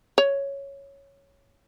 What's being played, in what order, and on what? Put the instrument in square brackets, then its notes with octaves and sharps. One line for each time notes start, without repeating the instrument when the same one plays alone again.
[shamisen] C#5